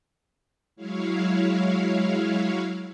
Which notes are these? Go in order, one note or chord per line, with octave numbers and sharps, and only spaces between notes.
F#3 G#3 E4 C#5 F5